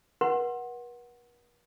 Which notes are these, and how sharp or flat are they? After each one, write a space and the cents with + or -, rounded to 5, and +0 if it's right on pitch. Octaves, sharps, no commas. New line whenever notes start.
B4 -45 F#5 +0 C6 +25